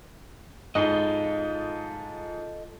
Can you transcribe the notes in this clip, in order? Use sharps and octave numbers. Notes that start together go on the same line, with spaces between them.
G#2 F4 A4 D#5